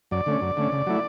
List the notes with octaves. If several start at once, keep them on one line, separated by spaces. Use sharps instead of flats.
F#2 D5
D3 A3 C#4
F#2
D3 A3 C#4
C#3
F#3 A3 E4